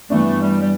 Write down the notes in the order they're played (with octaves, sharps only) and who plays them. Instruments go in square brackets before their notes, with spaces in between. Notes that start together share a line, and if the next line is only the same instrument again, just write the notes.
[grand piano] G2 E3 B3 D4 [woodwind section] A3
[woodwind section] G3
G3